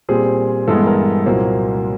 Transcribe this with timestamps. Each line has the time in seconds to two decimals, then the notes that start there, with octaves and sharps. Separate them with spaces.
0.09 A#2 G3 C4 G#4
0.68 G2 E3 G#3 B3 A4
0.87 A#4
1.26 C2 A#2 F#3 A#3 C5